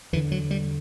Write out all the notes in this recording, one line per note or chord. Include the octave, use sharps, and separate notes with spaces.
E2 D3 E3
F#3
G3